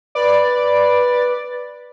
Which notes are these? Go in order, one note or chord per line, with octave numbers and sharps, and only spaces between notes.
B4 D5